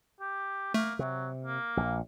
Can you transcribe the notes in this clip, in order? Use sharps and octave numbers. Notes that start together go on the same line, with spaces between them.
G4
A3 A#3
C3 F#3
A#3
A#1 A#2